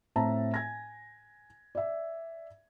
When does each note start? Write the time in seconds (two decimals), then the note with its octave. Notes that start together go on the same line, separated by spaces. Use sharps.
0.16 A2 C4 E5 A5 A#5
0.54 G#5 G#6 A#6
1.75 D5 E5